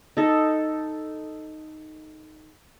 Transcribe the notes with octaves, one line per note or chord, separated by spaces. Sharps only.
D#4 A4